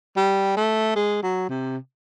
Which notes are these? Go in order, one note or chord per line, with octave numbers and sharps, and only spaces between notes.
G3
A3
G#3
F#3
C3